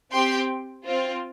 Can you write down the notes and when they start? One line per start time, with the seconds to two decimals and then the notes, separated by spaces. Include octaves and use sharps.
0.12 C4 G4 G5 C6
0.84 C4 F4